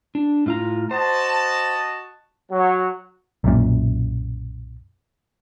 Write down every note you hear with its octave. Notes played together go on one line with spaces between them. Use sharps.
D4
A2 F4 A#5
F#4 C5 D#5 A5
F#3
B1 F#2 A#2